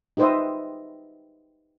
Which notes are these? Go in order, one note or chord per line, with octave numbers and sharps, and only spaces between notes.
D#4 G4 B4 C5 D#5 E5